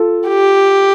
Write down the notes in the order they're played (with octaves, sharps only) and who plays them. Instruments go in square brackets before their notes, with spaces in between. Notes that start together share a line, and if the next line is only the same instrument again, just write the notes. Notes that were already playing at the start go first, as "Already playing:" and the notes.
Already playing: [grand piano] F4 A4
[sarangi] G4